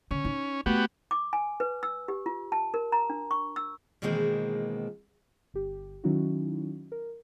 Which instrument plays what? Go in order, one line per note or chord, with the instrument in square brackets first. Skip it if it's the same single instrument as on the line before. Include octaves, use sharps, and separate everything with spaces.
[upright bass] D3 [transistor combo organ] C#4
[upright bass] D#4
[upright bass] A3 [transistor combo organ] B3 F#4 G4
[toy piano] D6
G#5
B4
E6
G4
F4
A5
A#4
A#5
D4
C#6
E6
[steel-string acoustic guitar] B2 D#3 E3 G#3 A#3 C4
[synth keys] G1 G4
D#3 F#3 C#4 D#4 E4 F#4
A#4